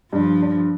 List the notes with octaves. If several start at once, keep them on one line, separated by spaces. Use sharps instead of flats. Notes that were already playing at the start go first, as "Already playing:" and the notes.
G2 F3
D4